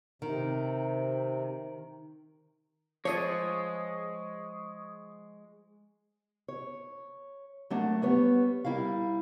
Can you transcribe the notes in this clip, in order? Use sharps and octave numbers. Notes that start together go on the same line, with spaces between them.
C3 D#3
F3 G#3 G#4 C#5 D5 C#6 D#6
C#5
F#3 A3 A#3 D4 F#5
G3 B3 C#5
G3 E4 A#4 F5